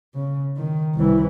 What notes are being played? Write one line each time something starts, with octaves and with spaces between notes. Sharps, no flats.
C#3
D#3
C2 E3